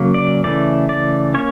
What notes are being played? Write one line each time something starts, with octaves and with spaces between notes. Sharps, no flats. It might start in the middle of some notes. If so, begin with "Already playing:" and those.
Already playing: C#3 F#3 A#3
D5
C#3 E3 A3 D5
D5
A#3 C#4 C#5